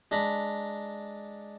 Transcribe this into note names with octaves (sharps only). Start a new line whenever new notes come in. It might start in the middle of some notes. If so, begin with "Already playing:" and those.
G#3 D4 A#5 B5